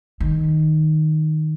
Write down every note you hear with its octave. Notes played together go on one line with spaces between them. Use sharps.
D#3